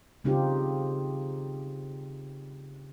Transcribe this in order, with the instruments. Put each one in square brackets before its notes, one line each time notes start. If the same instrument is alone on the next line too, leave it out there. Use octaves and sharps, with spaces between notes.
[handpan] C#3 C4 D#4 F4 G4